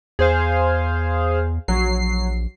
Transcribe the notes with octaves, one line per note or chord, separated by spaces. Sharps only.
E2 G#4 C5 F5
A#1 F#3 C7